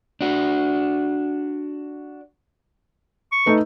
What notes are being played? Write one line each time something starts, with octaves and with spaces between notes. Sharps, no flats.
D4 F#4
C#6
A3 D#4 B4